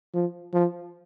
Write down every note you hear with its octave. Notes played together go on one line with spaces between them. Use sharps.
F3
F3